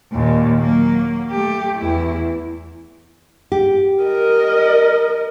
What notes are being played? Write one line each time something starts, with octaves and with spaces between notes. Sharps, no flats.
D#2 A#2
F#3 A#3
A3 G4
E2 E4
G4
A#4 D#5